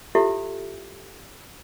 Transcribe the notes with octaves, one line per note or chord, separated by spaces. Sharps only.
E4 F4 G4 A4 E5